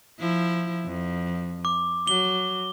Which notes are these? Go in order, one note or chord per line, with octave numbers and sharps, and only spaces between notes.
F3 E4
F2
D6
F#3 G7